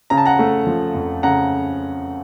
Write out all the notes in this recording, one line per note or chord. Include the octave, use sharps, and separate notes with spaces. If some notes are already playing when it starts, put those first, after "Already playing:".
C#3 A#5
A5
F#5 A#5
A3
F3
F2
C#3 F#5 A#5